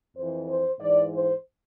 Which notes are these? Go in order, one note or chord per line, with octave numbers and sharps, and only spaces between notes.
F2 E3 C5
C5
G#2 E3 D5
C5